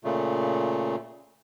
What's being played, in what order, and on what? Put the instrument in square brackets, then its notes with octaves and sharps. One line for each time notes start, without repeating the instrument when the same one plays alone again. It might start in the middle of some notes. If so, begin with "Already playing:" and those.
[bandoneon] A#2 C#3 A3